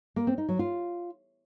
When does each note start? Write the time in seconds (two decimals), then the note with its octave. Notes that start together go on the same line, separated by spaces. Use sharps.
0.16 A#3
0.27 C4
0.38 D#4
0.49 F#3
0.59 F4